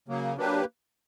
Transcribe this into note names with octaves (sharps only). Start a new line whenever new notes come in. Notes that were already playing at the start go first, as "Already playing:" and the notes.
C#3 F#3 A#3
F#3 A#3 D4 G4 B4